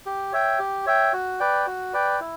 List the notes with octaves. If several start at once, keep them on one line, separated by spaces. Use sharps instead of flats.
G4
C#5 E5 G5
G4
C#5 E5 G5
F#4
B4 D5 G5
F#4
B4 D5 G5
E4